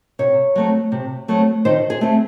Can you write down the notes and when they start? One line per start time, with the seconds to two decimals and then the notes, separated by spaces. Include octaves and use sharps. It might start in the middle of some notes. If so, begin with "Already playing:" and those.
0.19 C3 C#5
0.56 F#3 A3 C4
0.92 C3
1.28 F#3 A3 C4
1.65 D#3 C5
1.90 G#4
2.01 A3 C4